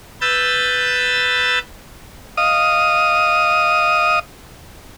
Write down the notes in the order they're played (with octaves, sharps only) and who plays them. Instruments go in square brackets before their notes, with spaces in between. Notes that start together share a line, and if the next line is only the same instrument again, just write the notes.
[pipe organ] B4 E6 G6 A6
[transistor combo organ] D#5 F5 D#6